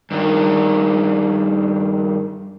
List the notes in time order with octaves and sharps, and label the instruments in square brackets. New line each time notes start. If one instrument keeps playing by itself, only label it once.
[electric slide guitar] G2 D#3